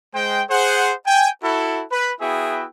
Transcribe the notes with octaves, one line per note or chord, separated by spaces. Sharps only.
G#3 C5 G5
G#4 C5 F#5
G5 G#5
E4 F#4 A4
B4
B3 E4 F#4 G#4 E5 G5